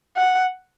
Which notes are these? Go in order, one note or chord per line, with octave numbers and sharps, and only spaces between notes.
F#5